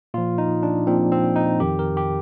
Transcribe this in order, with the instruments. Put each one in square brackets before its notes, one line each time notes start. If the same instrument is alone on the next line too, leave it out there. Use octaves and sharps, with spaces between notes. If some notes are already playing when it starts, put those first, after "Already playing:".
[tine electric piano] A#2 F3 F4
D#4
D4
A#2 F3 C4
C4
D#4
F2 D#3 G4
A#4
G4